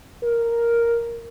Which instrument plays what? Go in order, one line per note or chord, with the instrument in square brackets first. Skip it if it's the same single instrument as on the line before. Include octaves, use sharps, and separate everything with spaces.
[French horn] A#4